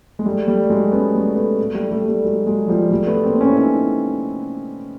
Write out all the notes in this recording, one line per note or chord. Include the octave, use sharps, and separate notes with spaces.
G#3
G3 A3
G3 A3
A3
F#3 G#3
B3 C#4
G3 A3
A3 B3
G3 A3
G3 A3
G3 A3
F#3 G#3
F#3 G#3
F3 G3
G3 A3
A3 B3
A#3 C4
C4
B3 C#4
E4
C#4 D#4